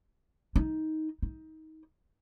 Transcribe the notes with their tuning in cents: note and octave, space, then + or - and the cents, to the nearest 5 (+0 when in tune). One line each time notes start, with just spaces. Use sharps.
D#4 +15
D#4 +20